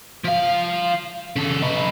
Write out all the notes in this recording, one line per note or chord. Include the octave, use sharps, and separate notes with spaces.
F3 F5
C#3 A4
D#4 B4